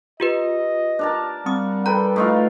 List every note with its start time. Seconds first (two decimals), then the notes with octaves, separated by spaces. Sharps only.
0.20 F4 G4 B4 D#5
0.99 D4 A#4 A5
1.46 G3 C4 F#5 D#6
1.86 A4 B4 G5 A#5
2.16 A2 D#4 F4